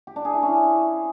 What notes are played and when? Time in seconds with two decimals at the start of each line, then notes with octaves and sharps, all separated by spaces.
0.07 G4
0.16 D4
0.25 G#4
0.34 E4
0.43 C#4